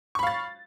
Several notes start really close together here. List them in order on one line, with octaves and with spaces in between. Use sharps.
C#6 B5 F5 A6